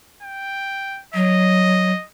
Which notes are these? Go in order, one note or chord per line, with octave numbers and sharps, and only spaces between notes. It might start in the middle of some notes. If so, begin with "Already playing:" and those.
G5
F#3 D#5